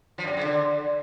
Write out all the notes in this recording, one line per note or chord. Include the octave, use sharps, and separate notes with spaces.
F3
F#2
C3
C#3
D3